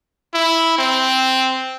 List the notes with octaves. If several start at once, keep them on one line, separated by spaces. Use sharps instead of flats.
E4
C4